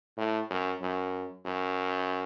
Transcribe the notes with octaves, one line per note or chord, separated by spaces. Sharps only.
A2
F#2
F#2
F#2